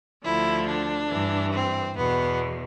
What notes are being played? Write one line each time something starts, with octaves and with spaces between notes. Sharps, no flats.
D2 D3 F3 E4
D4
G2 E3
C4
E2 B2 B3